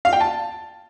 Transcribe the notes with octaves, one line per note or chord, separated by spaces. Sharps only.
F5
G5
A5